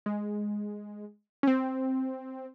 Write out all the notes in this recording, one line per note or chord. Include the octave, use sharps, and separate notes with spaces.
G#3
C#4
C4